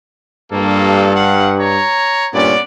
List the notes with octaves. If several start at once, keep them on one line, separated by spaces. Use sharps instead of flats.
G2 A#3 F4 A4
F5 F#5
C#5 A#5
G2 A#2 B3 C#4 D5